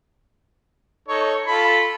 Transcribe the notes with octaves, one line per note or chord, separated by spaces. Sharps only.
D#4 A4 C#5
F4 A4 B5